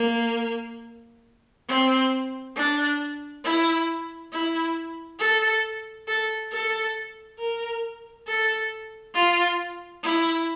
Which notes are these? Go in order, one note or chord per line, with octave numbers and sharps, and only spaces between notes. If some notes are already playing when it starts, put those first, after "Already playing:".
Already playing: A#3
C4
D4
E4
E4
A4
A4
A4
A#4
A4
F4
E4